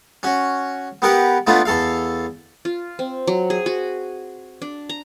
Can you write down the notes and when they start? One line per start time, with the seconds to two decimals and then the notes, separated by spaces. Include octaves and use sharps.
0.23 C#4 F#4
1.02 B3 G4 A#4 F#5
1.47 A3 B3 D4 F4
1.65 E2 A4 F5
2.65 F4
2.99 C4
3.27 F#3
3.50 G#4
3.66 F#4
4.62 D4
4.89 A#5